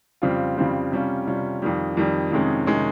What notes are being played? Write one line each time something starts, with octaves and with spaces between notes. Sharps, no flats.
F2 C#3 G3 C4 F4
F2 C#3 G3 C4 F4
C3 G3 C#4 F4
C3 G3 C#4 F4
F2 D#3 G3
F2 D#3 G3
F2 C3 D#3 G#3 C#4
C3 D#3 G#3 C#4